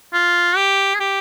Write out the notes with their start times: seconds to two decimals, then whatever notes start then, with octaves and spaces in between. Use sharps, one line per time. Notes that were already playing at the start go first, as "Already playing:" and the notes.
0.13 F4
0.57 G4
0.95 G#4
1.00 G4